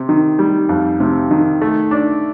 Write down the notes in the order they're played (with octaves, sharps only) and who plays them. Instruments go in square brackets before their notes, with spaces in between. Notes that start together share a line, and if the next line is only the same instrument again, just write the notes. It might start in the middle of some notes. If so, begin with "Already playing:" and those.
Already playing: [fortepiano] C3
D#3
G3
F2
C3
D#3
A3
D4